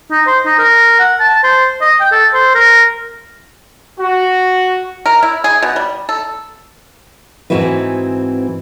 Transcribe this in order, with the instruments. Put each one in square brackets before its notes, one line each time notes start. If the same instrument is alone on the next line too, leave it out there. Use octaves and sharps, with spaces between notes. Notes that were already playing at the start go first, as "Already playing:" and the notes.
[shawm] D#4
C5
D#4
A#4
F#5
A5
C5
D#5
G5
A4
C5
A#4
[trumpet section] F#4
[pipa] A#4
E4
G#4
B2
G3
A4
[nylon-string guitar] G#2 E3 C4 E4 F#4 B4